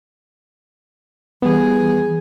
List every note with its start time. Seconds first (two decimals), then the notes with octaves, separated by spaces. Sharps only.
1.42 E3 G3 B3 G#4